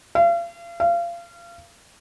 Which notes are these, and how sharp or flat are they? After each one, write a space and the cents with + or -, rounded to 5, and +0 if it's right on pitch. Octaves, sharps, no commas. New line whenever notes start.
F5 -40
F5 -30